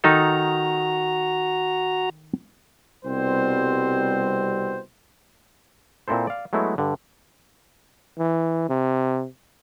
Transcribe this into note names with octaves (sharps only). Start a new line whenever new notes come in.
D#3 D#4 F#4 A4 A#5
C2 B2 G3 C4 C5
A#2 C4 E4 A4 C5
D5 F5
F#3 G#3 A3 B3 E4
G2 D3
E3
C3